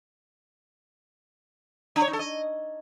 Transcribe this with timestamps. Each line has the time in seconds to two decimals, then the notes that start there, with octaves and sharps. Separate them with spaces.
1.96 D4
2.02 C#5
2.08 D#4
2.13 A4
2.19 D#5